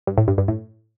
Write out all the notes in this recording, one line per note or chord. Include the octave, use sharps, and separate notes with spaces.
G2
A2
G2
G2
A2